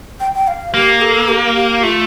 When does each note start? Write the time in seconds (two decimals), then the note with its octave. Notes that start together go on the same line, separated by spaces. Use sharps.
0.20 G5
0.35 G5
0.47 F5
0.74 A#3 G4
1.01 A4
1.29 G4
1.55 G4
1.82 A3 F4